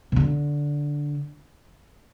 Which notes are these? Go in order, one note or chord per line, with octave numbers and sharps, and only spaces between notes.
B2
D3